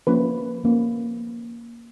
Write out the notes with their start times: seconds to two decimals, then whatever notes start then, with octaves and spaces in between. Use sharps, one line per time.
0.07 F3 A#3 C#4 B4
0.64 F3 A#3 C#4